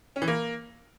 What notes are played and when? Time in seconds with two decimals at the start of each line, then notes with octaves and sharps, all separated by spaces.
0.16 C#4
0.22 E3
0.28 A#3